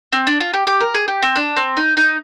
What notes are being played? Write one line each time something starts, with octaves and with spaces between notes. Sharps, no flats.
C4
D4
F4
G4
G4
A#4
G#4
G4
C4
D4
C4
D#4
D#4